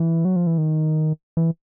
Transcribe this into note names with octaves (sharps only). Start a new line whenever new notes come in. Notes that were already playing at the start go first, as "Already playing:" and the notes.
Already playing: E3
F#3
F3
E3
D#3
E3